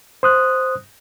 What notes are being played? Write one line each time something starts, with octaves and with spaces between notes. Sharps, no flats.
C5 D#6 F#6